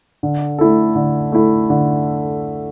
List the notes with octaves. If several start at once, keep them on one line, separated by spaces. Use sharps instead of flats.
D3
A3 E4 A4
D3
A3 E4 A4
D3